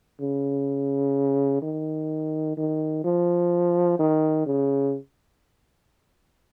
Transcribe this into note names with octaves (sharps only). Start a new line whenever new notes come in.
C#3
D#3
D#3
F3
D#3
C#3